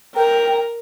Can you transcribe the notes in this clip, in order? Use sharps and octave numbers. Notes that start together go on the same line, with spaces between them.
A#4 G5